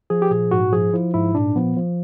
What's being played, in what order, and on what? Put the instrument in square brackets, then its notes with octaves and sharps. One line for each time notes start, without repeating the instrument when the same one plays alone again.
[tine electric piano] F3 G#4
G4
A#2 G#4
G#2 F#4
F3 G#4
F3 E4
G#2 E4
A#2 D4
F3 B3
F3